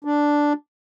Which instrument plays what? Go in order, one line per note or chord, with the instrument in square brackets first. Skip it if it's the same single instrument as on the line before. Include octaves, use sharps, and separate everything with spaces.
[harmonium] D4